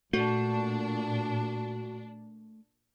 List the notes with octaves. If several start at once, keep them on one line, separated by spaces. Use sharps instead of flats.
A#2 A3 D4 F#4